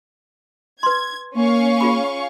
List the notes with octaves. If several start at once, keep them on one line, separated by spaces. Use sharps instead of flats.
B4 C6 G#6
A#3 C#4 F5 C#6
F4 G#4 B5